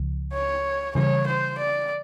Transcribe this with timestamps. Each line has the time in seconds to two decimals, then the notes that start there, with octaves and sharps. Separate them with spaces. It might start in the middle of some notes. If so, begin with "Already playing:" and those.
Already playing: C#2 C#3 F3
0.33 C#5
0.95 C#3 E3 G3 C#5
1.27 C5
1.58 D5